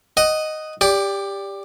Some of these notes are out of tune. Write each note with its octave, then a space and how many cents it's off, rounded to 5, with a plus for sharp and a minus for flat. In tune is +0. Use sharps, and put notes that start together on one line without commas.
D#5 +0 F#5 +20
G4 +15 D5 -15